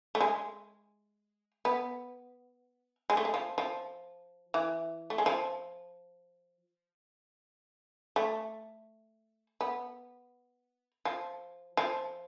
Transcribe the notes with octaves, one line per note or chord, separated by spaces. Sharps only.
A3
G#3
B3
G#3
A3
G#3
F3
F3
E3
A3
G#3
F3
A3
B3
F3
F3